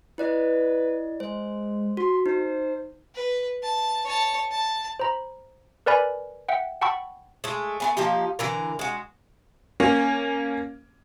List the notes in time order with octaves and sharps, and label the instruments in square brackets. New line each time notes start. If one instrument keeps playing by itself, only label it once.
[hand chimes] E4 D5 D#5 [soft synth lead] B4
[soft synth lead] G#3 [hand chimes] C5
[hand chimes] F#4 [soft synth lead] C6
[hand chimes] D#4 [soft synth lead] C5
[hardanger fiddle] B4
A5
C#5 A5
A5
[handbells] C5 A#5 B5
A#4 B4 D5 G#5 B5
E5 F#5 G5
F#5 G5 A5 B5 C#6 E6
[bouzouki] G#3 A3
A3 B3 G#5
F3 A#3 D#4 G4
D3 E3 A#4
G#3 F#4
[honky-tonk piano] A#3 C#4